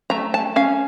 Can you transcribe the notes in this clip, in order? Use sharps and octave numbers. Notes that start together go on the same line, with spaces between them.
A3 A#5
A5
C#4 F5